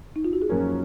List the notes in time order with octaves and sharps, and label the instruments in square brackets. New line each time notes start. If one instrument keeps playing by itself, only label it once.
[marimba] D#4
F4
F#4
G#4
[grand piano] F#2 F3 A#3 C#4 [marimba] A#4